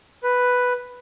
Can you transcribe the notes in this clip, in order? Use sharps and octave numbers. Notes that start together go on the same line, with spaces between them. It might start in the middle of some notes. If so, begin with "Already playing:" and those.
B4